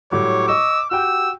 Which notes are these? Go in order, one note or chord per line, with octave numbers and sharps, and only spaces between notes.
A2 F#3 G3 C#5 D6
D#5 C#6 E6
F#4 G4 G5 E6